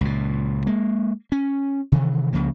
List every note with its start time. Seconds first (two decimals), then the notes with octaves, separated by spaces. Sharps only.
0.01 C#2 A#2
0.66 G#3 A#3
1.32 C#4
1.92 C3 D#3 E3
2.33 C#2 C#3 F3 A#3